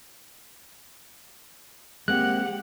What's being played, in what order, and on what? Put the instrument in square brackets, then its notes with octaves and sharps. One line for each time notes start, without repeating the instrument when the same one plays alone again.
[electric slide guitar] G#3 A#3 C4 [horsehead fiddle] G4 F#5 [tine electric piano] F#6